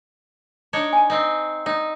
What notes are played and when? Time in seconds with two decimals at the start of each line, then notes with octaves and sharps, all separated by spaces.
0.73 D4 D#4 C#5
0.93 G#5
1.10 C4 D#4
1.66 D#4 D5